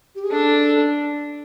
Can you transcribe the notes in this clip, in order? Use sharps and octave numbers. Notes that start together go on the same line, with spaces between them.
G4
G#4
D4 A4